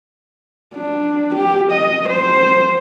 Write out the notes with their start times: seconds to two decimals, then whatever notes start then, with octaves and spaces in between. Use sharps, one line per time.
0.75 D4
1.35 G4
1.72 D#5
2.09 C5